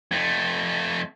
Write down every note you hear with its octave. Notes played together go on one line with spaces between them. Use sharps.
F2 A3